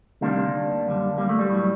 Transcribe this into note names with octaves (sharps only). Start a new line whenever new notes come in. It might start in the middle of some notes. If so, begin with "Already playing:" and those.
D2 C3 D#3 G3 A#3 D4
F#2 D3 G3
G3 A#3
A3
G3
A2 F#3